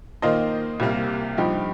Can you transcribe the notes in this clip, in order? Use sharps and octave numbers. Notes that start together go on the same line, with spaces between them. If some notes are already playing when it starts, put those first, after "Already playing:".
D#3 A#3 F4 C5 D#5
C2 C3 G3 A#3
G2 F3 D#4 G4